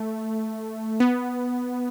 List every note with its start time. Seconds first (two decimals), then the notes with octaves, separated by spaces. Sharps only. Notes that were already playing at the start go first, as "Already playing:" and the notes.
Already playing: A3
1.00 B3